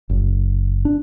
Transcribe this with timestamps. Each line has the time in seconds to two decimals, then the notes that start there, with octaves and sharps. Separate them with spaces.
0.09 F#1
0.85 D4